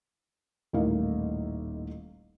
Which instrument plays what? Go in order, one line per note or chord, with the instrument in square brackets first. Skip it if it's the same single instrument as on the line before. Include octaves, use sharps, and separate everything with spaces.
[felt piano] D#1 A1 A#3 D#4 E4 F5